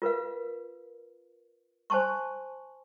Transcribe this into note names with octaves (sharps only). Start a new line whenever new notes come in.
F4 A#4 B4 F5
C5 G#5 A5 C6 C#6